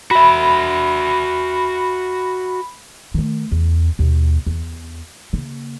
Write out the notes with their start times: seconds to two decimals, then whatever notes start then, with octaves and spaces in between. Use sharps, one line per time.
0.11 F#4 E5 B5
3.14 D#3 A3
3.52 E2
3.99 D#2 B2
4.47 E2
5.33 C#3 A#3